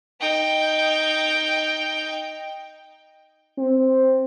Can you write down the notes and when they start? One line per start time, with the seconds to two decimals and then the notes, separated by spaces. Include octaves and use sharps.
0.21 D#4 G5
3.58 C4